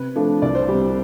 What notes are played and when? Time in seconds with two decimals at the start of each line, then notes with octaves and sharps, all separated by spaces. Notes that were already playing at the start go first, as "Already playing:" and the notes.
Already playing: C3 B4
0.16 F3 A3 D4
0.42 C2 D5
0.55 C5
0.68 C3 G3 G4